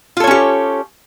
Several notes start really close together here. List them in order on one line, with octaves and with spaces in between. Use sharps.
F4 A4 C#5 C#4 G4